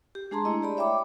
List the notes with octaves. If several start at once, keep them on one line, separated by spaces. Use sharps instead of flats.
G4
G#3 D4 G#4 A5 A#5 C6
A3 E4 D#5
G4 D5 B5
C#5 E5 G5 B5 D6